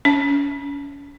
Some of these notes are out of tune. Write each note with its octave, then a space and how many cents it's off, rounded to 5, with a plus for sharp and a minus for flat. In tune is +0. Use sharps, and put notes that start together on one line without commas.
C#4 +35 A5 +0